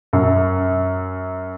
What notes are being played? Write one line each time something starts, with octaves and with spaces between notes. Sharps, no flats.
F#2